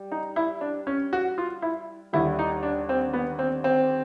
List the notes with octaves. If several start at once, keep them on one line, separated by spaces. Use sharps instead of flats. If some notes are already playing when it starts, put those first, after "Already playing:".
Already playing: G3
D#4
E4
D4
C#4
F#4
F4
E4
D#2 D3 G3 E4
D#4
D4
C4
B3
C4
C4